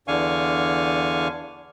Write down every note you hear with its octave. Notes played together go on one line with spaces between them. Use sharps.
E2 D3 D4 F5 G#5 C#6